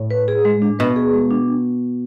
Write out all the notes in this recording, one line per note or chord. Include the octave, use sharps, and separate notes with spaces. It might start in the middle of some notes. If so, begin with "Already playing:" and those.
Already playing: A2
B4
G#4
G#3
D4
B2 B4
G#4
G#3
D4